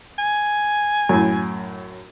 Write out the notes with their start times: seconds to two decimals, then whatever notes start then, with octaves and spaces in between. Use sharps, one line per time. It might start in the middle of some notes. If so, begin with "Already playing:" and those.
0.18 G#5
1.09 F#2 A2